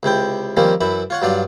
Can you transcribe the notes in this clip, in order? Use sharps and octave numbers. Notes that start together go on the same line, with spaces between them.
C#2 C3 E4 G5
D#3 F3 G3 A#3 C4 C#4
F#2 E3 E5 B5
F4 C#5 F#5
G2 F#3 F4 D5